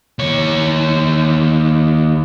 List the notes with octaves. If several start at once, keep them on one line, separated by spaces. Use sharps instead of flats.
D#2 C#5